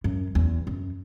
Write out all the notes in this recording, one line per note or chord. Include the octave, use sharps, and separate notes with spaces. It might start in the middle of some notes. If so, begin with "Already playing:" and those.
F#2
E2
F#2